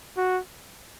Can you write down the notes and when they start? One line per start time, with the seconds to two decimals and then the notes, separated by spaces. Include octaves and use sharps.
0.17 F#4